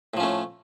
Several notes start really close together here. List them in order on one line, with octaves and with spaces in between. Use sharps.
A2 F3 C#4 A3